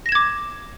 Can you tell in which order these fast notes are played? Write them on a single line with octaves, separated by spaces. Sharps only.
A#6 E7 G#6 D6